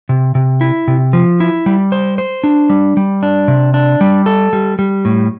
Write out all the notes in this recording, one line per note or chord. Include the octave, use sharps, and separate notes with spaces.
C3
C3
E4
C3
F3
E4
G3
C5
C5
D4
G3
G3
D4
C3
D4
G3
A4
G3
G3
A2